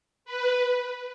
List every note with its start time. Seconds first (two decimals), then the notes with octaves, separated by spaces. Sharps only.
0.25 B4